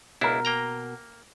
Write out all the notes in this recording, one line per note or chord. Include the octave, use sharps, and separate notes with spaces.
C#2 B2 D4 E4 A#4
A#3 G5 A#5